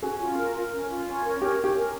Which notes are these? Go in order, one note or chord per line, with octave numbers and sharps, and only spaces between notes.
C#4 F#4 G#4
F4
A#4
A#4
C#4
F4
C#4
A#4
C#4 G4
C#4
G4
A#4